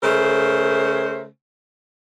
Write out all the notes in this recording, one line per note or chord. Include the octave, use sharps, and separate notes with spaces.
C#3 A3 A#4 C5